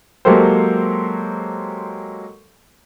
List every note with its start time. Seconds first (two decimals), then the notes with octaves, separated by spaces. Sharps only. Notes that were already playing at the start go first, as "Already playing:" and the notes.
0.25 F#3 G#3 A#3 G4 A4 C5